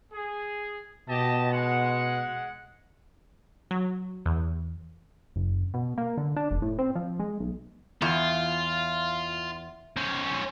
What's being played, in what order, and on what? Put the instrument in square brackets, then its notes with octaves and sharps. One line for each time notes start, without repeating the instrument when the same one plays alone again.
[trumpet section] G#4
[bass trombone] B2 [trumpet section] G4 D#5 A5
[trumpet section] G#3 F#5
[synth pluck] F#3
E2
[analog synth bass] F#1
B2
A#3
D3
D4
F1
A2
C4
F3
G#3
B1
[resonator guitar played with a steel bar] E2 [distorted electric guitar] F4
[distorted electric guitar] C#4 C5